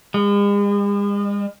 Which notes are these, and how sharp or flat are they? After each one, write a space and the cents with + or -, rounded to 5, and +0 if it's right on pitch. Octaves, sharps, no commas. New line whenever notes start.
G#3 -45